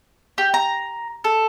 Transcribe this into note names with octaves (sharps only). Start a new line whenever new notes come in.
G4
A#5
A4